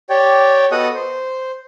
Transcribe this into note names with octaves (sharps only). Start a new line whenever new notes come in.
G4 C#5 D5 G5
B3 F#4 A4 D#5 F#5 D#6
C5